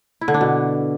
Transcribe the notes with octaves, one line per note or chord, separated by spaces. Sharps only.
E4
D3
D4
B2